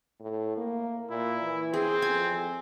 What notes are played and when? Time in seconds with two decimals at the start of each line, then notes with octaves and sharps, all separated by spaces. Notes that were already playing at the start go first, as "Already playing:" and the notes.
0.20 A2
0.57 A#3
1.10 A#2 E4
1.43 E3
1.74 C4 G#4
2.02 F2 G#5